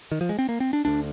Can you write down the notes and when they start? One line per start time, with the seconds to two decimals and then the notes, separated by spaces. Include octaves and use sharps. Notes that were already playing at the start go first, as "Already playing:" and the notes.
0.12 D#3
0.21 F3
0.29 G#3
0.39 C4
0.49 A#3
0.60 C4
0.73 D4
0.85 D2 D3 D4